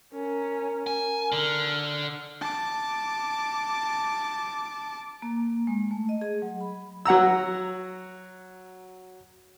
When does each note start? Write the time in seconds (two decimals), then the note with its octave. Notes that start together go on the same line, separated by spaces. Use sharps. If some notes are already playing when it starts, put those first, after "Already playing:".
0.14 C#4 A#4
0.87 G#5
1.32 D3 F6
2.41 A5 D6
5.22 A#3
5.67 G#3
5.91 A3
6.09 D#5
6.21 G#4
6.42 F#3
6.61 B5
7.05 F#3 F#5 A#5 E6